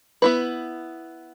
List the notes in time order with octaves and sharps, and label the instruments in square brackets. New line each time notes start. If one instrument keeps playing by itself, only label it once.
[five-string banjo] B3 E4 B4